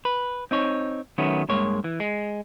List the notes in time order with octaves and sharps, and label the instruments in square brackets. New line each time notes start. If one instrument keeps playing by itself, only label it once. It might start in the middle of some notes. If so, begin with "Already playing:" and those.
[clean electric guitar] B4
C4 D#4 C#5
D#3 F#3 A3 B3 C#4
G2 G#3 A#3 C#5
E3
G#3